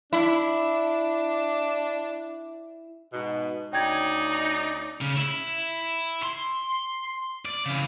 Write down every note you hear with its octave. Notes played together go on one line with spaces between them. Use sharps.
D4 E4
G#2 B2
D2 C#4 D#4 D5 G5 G#6
C#3
E4
C6
D5
C#3 E3